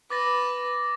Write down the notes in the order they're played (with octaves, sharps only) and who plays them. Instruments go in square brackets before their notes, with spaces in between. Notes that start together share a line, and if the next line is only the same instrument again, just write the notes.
[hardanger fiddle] B4 [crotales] D6 A6 A#6